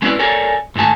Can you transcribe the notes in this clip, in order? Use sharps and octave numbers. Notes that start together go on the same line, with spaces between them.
G#3 C4 C#4 E4 B4 D5
A4 A#4 C#5 D5 G#5
G#2 D#3 A3 G#5 A5